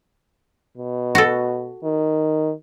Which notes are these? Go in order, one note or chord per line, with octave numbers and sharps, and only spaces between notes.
B2
F#4 A4
D#3